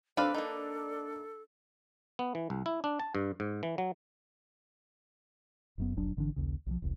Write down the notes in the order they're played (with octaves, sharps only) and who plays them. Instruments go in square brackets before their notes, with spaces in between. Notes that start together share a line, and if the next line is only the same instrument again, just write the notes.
[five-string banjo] C4 F5 [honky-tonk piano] D4 [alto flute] A4 [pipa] B4
[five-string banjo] A#3 D#4 [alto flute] A4
[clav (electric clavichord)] B3
E3
C2
E4
D4
A5
G2
G#2
E3
F#3
[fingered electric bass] F#1 F#2 B3
F1 B1 F#3 D4
G#1 D3 E3 D4
A#1 D#2 C#3
B1 E3 F3
E1 C2